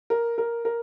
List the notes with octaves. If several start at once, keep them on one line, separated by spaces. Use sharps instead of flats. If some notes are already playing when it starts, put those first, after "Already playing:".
A#4
A#4
A#4